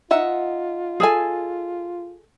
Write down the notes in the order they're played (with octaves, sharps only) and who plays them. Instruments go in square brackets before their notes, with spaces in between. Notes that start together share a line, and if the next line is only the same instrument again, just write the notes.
[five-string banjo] D#4 E5 F#5 [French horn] F4
[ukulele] G#4 A4 G#5